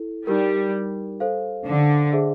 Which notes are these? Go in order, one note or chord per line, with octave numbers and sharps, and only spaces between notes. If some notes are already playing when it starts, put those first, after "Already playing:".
Already playing: E4 A4
G3 D#4 G4 A#4
A4 C5 F5
D3
G#4 C5 E5